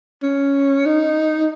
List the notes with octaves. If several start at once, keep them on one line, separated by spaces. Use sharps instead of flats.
C#4
D#4